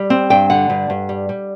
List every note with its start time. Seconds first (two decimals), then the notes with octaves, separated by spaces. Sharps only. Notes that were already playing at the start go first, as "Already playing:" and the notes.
Already playing: G3
0.10 C4
0.30 G2 G5
0.50 D3 F#5
0.70 G2
0.90 G2
1.09 G3
1.29 G3